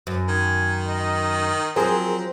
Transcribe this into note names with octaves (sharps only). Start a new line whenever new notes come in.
F#2
D#3 G#5
D#5
F3 F#3 C4 G#4 A#4 A#5